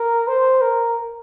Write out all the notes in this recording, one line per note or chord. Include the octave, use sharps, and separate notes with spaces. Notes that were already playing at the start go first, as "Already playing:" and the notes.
Already playing: A#4
C5
A#4